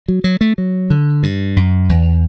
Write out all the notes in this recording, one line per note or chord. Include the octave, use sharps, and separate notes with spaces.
F#3
F#3
A3
F#3
D3
G2
F#2
E2